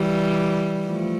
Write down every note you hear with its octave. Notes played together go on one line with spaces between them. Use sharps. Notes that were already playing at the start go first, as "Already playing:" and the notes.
Already playing: E3 G3
F3 A3